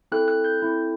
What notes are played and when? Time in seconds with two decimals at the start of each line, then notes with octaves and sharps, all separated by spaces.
0.12 C4 E4 A4 F#6
0.28 F#6
0.44 G6
0.60 C4 E4 A4